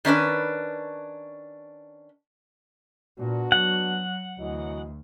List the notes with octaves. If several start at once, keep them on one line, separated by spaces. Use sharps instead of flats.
D#3 C#4 D4 B4
A#2 B3 D4 F#4
F#3 F#5
D2 E3 F#3 D#5